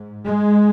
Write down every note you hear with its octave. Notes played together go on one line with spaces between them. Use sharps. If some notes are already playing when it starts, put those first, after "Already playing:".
Already playing: G#2
G#3